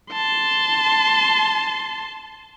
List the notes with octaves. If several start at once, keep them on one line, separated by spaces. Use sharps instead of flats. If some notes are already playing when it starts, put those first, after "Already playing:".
A5 C6